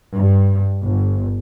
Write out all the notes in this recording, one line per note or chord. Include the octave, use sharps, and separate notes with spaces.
G2
G1